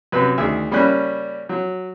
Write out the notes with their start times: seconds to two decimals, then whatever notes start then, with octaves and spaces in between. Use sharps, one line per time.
0.12 F#2 C3 B4 B5
0.38 D2 D#3 G#4 E5
0.71 C#3 G3 A#3 C#4 B5 F#6
1.49 F#3